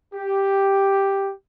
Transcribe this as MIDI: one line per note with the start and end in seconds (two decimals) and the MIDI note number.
0.14 1.31 67